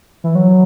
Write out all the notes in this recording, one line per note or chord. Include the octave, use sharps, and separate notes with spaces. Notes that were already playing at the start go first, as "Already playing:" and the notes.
E3
F#3